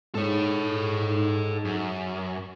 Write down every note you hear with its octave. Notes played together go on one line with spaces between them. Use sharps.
G#2 A4 C#5
F#2